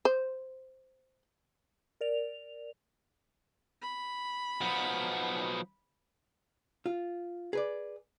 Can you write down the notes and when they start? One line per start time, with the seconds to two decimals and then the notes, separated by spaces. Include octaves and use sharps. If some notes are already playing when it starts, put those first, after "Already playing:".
0.05 C5
2.01 A#4 D5 F7
3.82 B5
4.61 F3 F#3 B3 D#4
6.86 F4
7.53 G#4 B4 D5